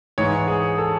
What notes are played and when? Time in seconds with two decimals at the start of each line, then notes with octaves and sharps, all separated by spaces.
0.18 G#2 E3 C#5
0.48 G#4
0.78 A4